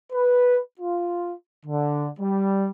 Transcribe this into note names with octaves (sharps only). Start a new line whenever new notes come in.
B4
F4
D3
G3